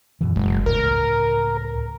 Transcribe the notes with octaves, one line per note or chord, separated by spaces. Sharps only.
F#2 B2 E3
F#1 G#3
C#2 A2 A#4